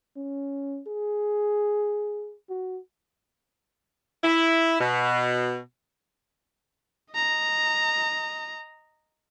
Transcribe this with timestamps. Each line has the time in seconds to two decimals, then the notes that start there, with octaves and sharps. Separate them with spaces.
0.16 C#4
0.87 G#4
2.49 F#4
4.23 E4
4.80 B2
7.14 D#5 A#5